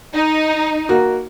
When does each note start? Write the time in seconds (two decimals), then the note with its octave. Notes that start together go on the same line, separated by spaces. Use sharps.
0.15 D#4
0.89 A#3 F#4